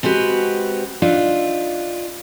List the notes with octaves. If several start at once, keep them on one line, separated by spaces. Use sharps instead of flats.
G#3 C4 F#4 G4 B4
D4 D#4 F4 E5